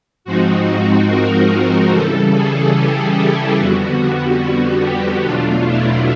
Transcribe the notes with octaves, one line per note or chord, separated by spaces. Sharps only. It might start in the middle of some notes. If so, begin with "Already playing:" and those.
G#2 F3 G#3 C4 D#4 F#4
F#4
A#4
C#3 E3 G3 A4
G#4
G4
E4
F2 D3 G3 B3 F#4
G4
E2 B2 F#3 A3 D4 F4
E4